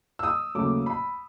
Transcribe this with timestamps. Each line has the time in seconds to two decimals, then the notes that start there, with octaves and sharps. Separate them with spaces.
0.19 E6
0.23 D#6
0.55 D#2 C#3 F#3 A3 C#4 D6
0.86 B5